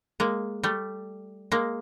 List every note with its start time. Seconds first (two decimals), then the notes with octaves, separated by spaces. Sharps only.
0.20 G#3 A#3
0.63 G3 A3
1.52 G#3 A#3